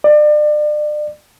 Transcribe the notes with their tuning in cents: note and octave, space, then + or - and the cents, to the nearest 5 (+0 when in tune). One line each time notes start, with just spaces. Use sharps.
D5 +35